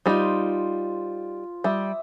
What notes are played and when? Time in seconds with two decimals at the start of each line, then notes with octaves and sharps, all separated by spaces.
0.06 G3 D#4 F4 C5
1.64 G3 E5 D#6